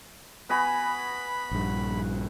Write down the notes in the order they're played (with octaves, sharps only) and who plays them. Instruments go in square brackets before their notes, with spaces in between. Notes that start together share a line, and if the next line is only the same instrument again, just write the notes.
[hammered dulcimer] B3 F#4 G#5 [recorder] B5
[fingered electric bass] A#1 G2